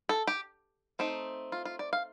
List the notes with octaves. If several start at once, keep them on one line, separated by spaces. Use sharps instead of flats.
A4
G4
A3 C4 D#4
F4
F4
D5
F5